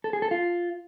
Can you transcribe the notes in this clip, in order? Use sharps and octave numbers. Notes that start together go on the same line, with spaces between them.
A4
G#4
A4
F4